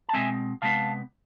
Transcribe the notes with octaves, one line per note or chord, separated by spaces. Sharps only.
A5
B2 G#3 C4 E5 G#5
C3 G#3 B3 F5 A5